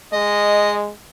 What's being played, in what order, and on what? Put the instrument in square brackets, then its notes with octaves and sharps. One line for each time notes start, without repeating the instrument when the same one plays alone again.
[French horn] G#3 [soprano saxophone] D#5